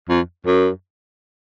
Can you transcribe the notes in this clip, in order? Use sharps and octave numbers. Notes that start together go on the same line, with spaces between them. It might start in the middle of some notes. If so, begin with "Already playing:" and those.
F2
F#2